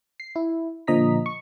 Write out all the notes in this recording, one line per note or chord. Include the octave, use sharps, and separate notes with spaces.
C7
E4
A#2 D3 F3 D#5 A#5 B6
C#6